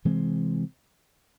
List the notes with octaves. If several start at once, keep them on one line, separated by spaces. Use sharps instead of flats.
C3 E3 G#3 C4